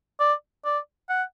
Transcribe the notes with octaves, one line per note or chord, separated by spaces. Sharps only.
D5
D5
F#5